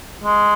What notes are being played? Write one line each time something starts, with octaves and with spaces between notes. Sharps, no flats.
G#3